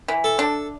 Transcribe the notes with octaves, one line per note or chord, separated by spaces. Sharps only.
E3
A4
D4